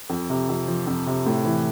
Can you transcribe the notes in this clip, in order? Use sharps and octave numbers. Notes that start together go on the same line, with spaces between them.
F2
C3
F2
F3
F2
C3
A2
E3